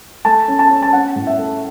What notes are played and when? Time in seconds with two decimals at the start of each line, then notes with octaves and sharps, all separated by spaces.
0.25 A3 A5
0.48 C#4
0.59 A5
0.70 C#4
0.83 A5
0.93 C#4 F#5
1.16 A2
1.27 E5
1.38 A3